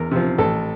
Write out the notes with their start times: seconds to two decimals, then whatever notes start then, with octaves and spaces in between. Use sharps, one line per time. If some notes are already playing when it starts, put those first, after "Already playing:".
Already playing: E2 A#4
0.11 C3 F3
0.38 A1 A4